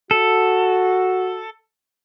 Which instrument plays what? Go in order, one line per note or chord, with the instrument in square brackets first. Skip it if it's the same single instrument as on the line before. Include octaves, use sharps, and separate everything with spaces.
[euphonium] F#4 [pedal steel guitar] A4